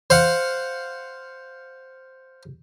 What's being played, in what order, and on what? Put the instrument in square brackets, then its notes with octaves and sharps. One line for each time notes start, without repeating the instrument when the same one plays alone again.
[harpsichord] C5 F5 F#5